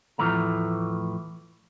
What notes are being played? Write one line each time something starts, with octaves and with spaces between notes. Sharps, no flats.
E2 A2 E3 F3 A3 A#5